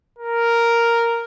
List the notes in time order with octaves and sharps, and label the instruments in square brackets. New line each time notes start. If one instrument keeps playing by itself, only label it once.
[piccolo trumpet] A#4